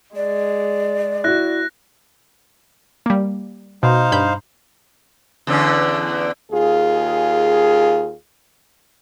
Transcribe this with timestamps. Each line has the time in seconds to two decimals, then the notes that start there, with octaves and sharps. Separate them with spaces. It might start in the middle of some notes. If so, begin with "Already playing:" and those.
0.16 G#3 D5
1.24 E4 F#4 F#6 A#6
3.06 G3 A#3
3.83 B2 D#4 C5 F5
4.12 G2 B5 G6
5.47 E2 D3 C#4
6.52 D#2 F4 G#4